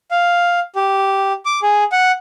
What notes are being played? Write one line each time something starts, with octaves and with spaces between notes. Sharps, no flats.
F5
G4
D6
G#4
F#5